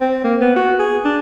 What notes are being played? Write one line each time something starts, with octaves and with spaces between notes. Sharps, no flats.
C4
A#3
B3
F#4
G#4
D4